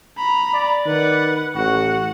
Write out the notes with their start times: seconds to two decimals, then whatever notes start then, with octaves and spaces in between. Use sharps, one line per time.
0.18 A#5 B5
0.54 D5
0.86 D#3 B4 F#5
1.56 A1 F#4 F#5